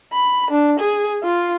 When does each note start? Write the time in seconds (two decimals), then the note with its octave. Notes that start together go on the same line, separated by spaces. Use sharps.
0.13 B5
0.51 D4
0.80 G#4
1.23 F4